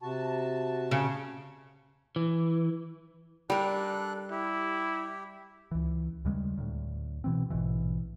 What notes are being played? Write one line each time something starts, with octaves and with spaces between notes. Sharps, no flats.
C3 F#4 A5
C#3
E3
G3 D4 A4 A#4 F#6
E4 G4
C#2 E3
D#2 C#3 G3 G#3
D2 A2
B2 E3 C4
A#1 G#2 B2 E3